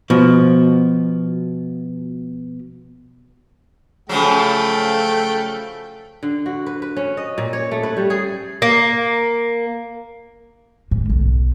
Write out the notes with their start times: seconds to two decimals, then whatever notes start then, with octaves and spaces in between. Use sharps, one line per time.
0.10 B2 F3
4.09 C#3 F3 F#3 A3 G5
6.23 D3
6.46 F#4
6.66 B4
6.82 B4
6.97 C#4
7.17 D#5
7.38 A#2
7.53 C#5
7.71 A3
7.83 B4
7.97 G3
8.10 G#4
8.62 A#3
10.91 G#2
11.10 B1